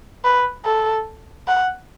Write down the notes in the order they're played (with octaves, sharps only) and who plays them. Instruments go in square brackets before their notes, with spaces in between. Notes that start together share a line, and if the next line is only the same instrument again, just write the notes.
[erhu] B4
A4
F#5